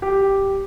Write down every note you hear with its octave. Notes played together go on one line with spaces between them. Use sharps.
G4